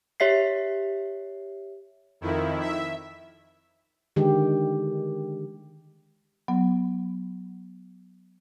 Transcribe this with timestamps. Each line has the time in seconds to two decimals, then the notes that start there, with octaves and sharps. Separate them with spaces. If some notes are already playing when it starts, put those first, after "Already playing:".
0.20 G4 C#5 E5 B6 C7
2.21 F2 D#3 E4
2.60 E5
4.16 D3 D#3 G#3 G4
6.48 F#3 B3